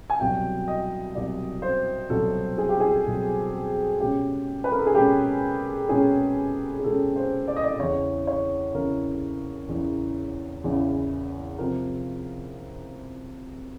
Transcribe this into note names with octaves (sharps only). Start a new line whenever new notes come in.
G#5
C2 B2 F#3 G5
D#5
C2 B2 F#3 D5
C5
C2 B2 F#3 A4
G#4
G4
G#4
C2 B2 F#3
B2 G#3 C#4 G4
B4
A#4
A4
G#4
B2 G#3 C#4 G4
B2 G#3 C#4 G#4
G#4
B2 G#3 C#4 A4
C5
D5
D#5
D5
E2 C#3 E3 C#5
C#5
E2 C#3 E3 A#4
E2 C#3 E3
E2 C#3 E3
C3 F3 A#4